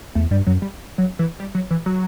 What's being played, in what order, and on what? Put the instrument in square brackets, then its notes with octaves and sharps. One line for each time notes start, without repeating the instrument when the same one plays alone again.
[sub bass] E2 [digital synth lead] A3
[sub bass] G2 [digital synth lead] G3
[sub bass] F#2 [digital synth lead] F#3
[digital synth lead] G3
F#3
E3
G3
F#3
E3
F#3